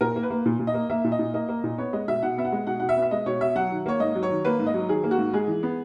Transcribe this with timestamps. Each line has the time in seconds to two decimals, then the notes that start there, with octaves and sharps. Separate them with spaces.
0.01 A#2 A#4
0.16 A#3
0.23 B4
0.30 A#3
0.46 A#2
0.60 A#2
0.67 D#5
0.74 A#3
0.90 A#3 E5
1.04 A#2
1.12 D#5
1.19 A#2
1.34 A#3 D#5
1.48 A#3
1.64 A#2
1.78 B3 C#5
1.93 G#3 D#5
2.08 B2 E5
2.23 B2 F#5
2.38 B3 E5
2.45 F#5
2.52 G#3
2.67 B2 F#5
2.80 B2 F#5
2.89 E5
2.97 B3
3.02 E5
3.11 G#3 D#5
3.26 B2 C#5
3.41 B2 E5
3.55 F#3 F#5
3.71 D#3
3.86 A#3 C#5
4.00 G#2 D#5
4.15 F#3
4.23 C#5
4.30 D#3
4.45 A#3 B4
4.60 G#2
4.67 D#5
4.74 F#3
4.89 D#3 G#4
5.04 A#3
5.11 F#4
5.19 G#2
5.33 G#3 G#4
5.48 E3
5.63 B3